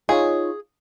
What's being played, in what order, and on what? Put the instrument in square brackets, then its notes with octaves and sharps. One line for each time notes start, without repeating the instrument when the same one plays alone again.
[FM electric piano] D#4 F4 C#5 [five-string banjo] G#4